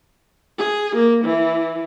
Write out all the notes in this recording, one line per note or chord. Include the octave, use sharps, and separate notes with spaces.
G#4
A#3
E3